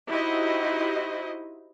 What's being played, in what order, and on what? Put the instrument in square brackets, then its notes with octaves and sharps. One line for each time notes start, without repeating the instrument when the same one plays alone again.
[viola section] D#4 E4 F#4 G4 C5 D#5